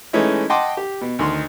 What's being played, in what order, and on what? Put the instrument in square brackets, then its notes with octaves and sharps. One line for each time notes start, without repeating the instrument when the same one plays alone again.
[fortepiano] E3 G#3 A3 C#4 D#4 E4
D#5 F#5 G5 A5 C6 D6
G4
B2
D2 D#3 C6